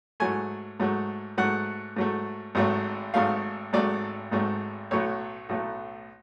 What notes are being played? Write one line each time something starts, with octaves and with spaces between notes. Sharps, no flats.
G#2 F#3 A3 G#5
G#2 F#3 A3
G#2 F#3 A3 F#5
G#2 F#3 A3
G#1 G#2 F#3 A3
G#1 G#2 F#3 A3 F5
G#1 G#2 F#3 A3 D5
G#1 G#2 F#3 A3
B1 A2 F#3 A3 C#5
B1 A2 F#3 A3